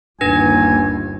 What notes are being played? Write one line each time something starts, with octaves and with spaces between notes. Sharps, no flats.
G1 D#2 D4 B4 G#5 A#6